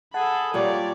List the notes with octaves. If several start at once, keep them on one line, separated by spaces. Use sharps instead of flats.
G#4 A4 F#5 A5 B5
A#2 G3 A#3 C#5 D5